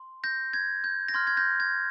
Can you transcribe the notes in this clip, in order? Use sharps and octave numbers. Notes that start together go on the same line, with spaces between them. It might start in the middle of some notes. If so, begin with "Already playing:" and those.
Already playing: C6
G6 A#6
G#6
G6
A#6
C6 F6 G#6
G#6
G6 A#6
G#6